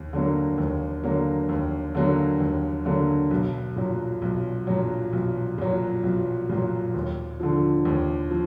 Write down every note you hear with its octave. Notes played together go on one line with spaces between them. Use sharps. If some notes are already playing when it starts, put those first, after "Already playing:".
Already playing: D#2
D3 F#3 A#3
D#2
D3 F#3 A#3
D#2
D3 F#3 A#3
D#2
D3 F#3 A#3
B1
A#2 F#3
B1
A#2 F#3
B1
A#2 F#3
B1
A#2 F#3
D#2
D3 F3
D#2
F3